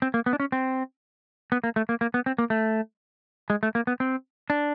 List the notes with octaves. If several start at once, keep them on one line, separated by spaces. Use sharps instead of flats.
C4
A#3
B3
D4
C#4
C4
B3
A#3
A3
A#3
A#3
B3
C4
A#3
A3
G#3
A3
A#3
B3
C4
D4